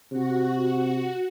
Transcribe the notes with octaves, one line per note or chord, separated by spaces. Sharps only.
C3 F#4